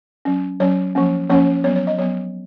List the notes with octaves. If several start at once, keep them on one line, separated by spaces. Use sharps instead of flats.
F#3 C#4
F#3 C#4 C#5
F3 A#3 C#4
F3 A#3 C#4 C#5
F#3 B3 C#5
C#5
D#5
F#3 B3 C#5